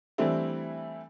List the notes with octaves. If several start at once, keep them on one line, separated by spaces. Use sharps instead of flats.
E3 G3 A3 C4 D4 E4